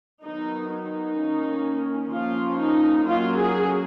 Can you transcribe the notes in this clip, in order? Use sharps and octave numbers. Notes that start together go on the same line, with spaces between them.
D#3 F#3 B3 D#4
D#4
D#3 A#3 C#4
F3 A#3 C#4 F4
D#4
F#3 A#3 C#4 F4
G#4